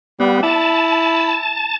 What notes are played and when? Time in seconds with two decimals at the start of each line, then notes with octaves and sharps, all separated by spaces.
0.20 G3 B3
0.43 E4 A5